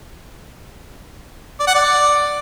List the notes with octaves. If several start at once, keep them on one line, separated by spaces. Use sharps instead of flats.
D5
F#5
D5